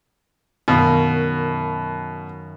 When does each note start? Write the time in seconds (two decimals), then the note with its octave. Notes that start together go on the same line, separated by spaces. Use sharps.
0.68 F#2 B2 D#3 F5